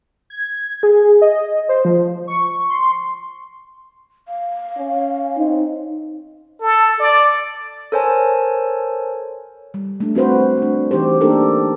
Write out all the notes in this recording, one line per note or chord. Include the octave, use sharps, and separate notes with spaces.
G#6
G#4
D#5
C5
F3
C#6
C6
F5
C#4
C4 D#4
A4
D5
A4 A#4 C5 C#5 G#5 A5
G3
A3 D4
C4 F#4 B4 C5
A3 D4
E3 D#4 G4 C5
A#3 D4 D#4 G4 A4 A#4